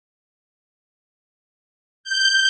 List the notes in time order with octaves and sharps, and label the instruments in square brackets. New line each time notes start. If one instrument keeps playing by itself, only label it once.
[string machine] G6